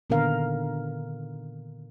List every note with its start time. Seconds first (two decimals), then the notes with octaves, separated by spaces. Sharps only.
0.10 A#2 D3 D#3 B3 A#4 F5